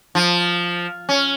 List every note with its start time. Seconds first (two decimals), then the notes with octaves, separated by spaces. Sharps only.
0.15 F3
1.09 C#4